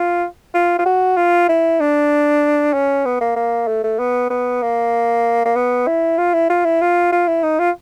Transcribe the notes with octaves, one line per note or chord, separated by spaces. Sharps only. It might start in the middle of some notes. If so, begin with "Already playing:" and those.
Already playing: F4
F4
F4
F#4
F4
E4
D4
C#4
B3
A#3
A#3
A3
A3
B3
B3
A#3
A#3
B3
E4
F4
E4
F4
E4
F4
F4
E4
D#4
F4